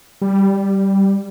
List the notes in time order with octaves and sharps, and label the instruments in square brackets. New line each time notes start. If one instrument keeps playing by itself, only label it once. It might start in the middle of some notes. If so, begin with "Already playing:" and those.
[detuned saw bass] G3